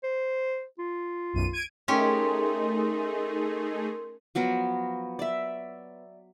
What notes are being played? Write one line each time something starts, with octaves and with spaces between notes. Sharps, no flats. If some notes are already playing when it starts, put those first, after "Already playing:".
C5
F4
B1 F#2 D#7
G#6 D7 D#7
A3 C#4 D#4 G4 G#4 A#4 C6
F3 F#3 B3 A#4
D5 E5